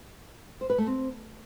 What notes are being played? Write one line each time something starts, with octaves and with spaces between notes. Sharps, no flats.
C5
B4
A3
C4